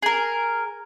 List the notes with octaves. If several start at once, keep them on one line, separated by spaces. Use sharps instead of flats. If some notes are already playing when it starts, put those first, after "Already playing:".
G#4 A#4